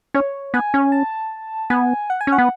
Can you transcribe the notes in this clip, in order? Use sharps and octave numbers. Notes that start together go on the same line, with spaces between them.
C#4 C#5
B3 G#5
C#4
A5
B3 G#5
F#5
G#5
C#4
F#5
B3